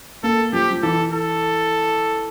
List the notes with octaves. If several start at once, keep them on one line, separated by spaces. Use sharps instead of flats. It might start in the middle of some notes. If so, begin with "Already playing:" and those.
A#3 A4
F3 G4
F3
E3 A4
A4